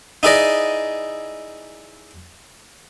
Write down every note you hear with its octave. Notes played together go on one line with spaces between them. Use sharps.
D#4 E4 G#4 B4 D5 D#5